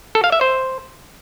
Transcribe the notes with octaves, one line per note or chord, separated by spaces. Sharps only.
A4
F5
E5
C5